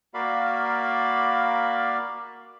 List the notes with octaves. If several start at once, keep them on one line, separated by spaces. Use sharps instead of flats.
A#3 F#4 A#4 D5 F5 B5